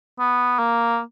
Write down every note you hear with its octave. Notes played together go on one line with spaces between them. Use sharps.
B3
A#3